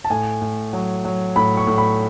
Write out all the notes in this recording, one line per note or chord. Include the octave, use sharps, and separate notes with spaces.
A5
A2 G#5
A2
F#3
F#3
A2 B5
C#6
A2
B5